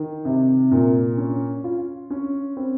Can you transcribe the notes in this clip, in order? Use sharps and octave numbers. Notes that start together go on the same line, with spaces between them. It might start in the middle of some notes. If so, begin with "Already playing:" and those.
Already playing: D#3
C3
A#2
C#4
F4
C#4
C4